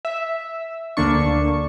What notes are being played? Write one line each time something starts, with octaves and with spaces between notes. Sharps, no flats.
E5
D2 D3 A#3 D4 C#6